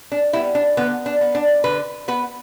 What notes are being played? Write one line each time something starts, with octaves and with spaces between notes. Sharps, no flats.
D4
G3 B3 E4
D4
D3 B3
D4
B3
D4
D3 B4
B3 B4